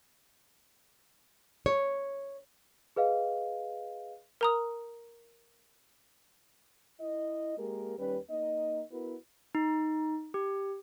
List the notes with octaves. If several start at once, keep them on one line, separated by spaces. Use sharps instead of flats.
C#5
G#4 B4 D#5 F5
A#4 A#5 D#6
E4 D#5
G#3 A#3 G4 A#4
D#2 G3 C#4 B4
A#3 D#4 D#5
B3 E4 F#4 A#4 B4
D#4
G4